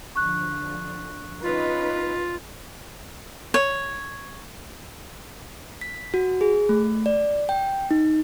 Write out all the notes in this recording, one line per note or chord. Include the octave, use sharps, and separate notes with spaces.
D3 F3 C#6 F#6
C#4 D#4 F4 B4
C#5
B6
F#4
G#4
A3
D5
G5
D#4